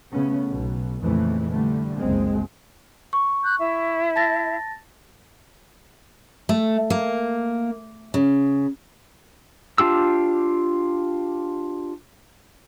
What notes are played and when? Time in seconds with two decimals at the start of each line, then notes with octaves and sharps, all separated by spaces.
0.11 C#3 A3 B3 C#4
0.47 B1 B2
1.02 F2 A#2 C#3 E3 F3 A3
1.50 D3 G3 A3
1.98 F#1 C2 G#3 C4
3.13 C#6
3.42 F#6 G6
3.58 E4 E5
4.16 A5 A6 A#6
6.49 A3
6.90 A#3
8.14 C#3
9.78 D4 F4 G4 E6